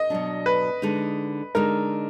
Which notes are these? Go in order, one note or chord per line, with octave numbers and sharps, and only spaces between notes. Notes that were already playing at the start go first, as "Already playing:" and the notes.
Already playing: D#5
B2 F#3 D4
B4
D3 G#3 D#4
D3 G#3 D#4 A#4